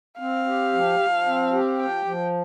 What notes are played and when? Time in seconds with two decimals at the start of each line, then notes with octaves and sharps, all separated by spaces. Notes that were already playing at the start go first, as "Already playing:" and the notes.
0.19 C4 F5
0.46 G4
0.73 F3
0.99 F3
1.26 C4
1.53 G4
1.79 F3 G5
2.05 F3